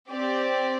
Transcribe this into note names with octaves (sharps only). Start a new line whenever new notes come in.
C4 G4 D5